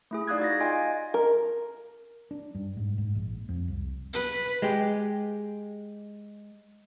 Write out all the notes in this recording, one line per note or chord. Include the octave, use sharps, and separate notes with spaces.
A3 E4 G#4
D#4 D5 F5 D#6 F#6 G#6
F#4 A6 A#6
F4 D#5 F5 G5 G#5
A#4
D4
G2
G#2
G#2
A#1
F2
C2
B4
G#3 G4